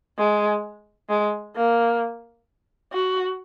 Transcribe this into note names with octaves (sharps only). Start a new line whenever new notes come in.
G#3
G#3
A#3
F#4